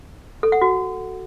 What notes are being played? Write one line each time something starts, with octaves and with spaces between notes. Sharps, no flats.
A4
F#5
F#4